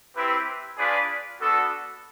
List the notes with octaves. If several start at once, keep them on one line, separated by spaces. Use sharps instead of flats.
C4 E4 G4 B4
D4 F4 G#4 B4 D5
B3 D4 F#4 A4